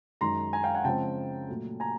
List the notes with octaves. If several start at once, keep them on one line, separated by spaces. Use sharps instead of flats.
F#2 D#3 G#3 A#5 C6
G#5 A#5
F5 G5
F#5 G#5
C#3 F3 G#3 C4 G5 A5
A#2 F#3 A3
G#5 A#5